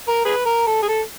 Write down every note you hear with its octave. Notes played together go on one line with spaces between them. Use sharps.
A#4
G#4 B4
A#4
A4
G#4
A4